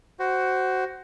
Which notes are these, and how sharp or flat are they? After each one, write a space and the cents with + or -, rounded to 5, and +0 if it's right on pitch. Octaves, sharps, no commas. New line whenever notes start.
F#4 +15 C5 +0